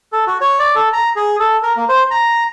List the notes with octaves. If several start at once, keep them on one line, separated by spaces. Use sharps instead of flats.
A4
F#4
C#5
D5
A4
A#5
G#4
A4
A#4
A#3
C5
A#5